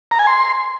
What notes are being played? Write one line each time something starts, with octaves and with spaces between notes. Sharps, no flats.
A#5
G#5
C6